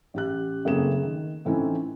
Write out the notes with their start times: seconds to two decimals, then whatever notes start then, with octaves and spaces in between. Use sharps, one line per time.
0.14 A1 G4 F#6
0.65 F#1 A3 A#3 C4 G#4 E7
1.03 D#3
1.45 A2 E3 C4 C#4 D#4 E4